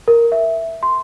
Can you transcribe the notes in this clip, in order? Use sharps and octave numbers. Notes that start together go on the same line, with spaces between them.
A#4
E5
C6